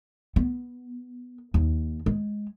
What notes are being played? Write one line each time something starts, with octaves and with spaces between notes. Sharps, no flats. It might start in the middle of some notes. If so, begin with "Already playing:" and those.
B3
D#2
G#3